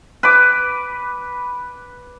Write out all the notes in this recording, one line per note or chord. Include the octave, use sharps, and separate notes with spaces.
B4 D6